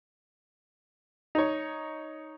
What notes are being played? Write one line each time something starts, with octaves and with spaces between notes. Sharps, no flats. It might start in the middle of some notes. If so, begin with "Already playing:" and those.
D#4 C#5